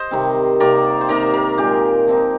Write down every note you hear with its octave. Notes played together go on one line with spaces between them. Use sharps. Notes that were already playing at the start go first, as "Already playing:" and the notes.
Already playing: C5 D#5
C3 D#3 G3 C4
C3 D#3 A#3 A#4 D5
C5
C3 D#3 A#3 D#4 A#4 D5
G4 A#4
A#2 G#3 D#4 G4
F3 C4 D#4